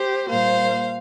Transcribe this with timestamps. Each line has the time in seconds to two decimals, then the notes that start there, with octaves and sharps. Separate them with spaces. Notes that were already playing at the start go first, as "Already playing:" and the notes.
Already playing: G4 C5
0.29 A#2 G3 A#3 C5 F5